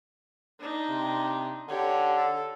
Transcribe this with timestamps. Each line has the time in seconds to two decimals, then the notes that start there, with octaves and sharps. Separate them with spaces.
0.60 D4 D#4
0.89 C3
1.69 D3 G4 C#5
2.15 A4